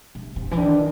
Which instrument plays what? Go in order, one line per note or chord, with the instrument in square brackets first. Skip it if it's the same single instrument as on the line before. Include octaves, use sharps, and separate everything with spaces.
[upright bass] C3
C3
E3
[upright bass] D#3 [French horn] D4